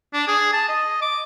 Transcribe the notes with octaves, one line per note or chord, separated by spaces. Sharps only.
D4
G#4
A5
D#5
D6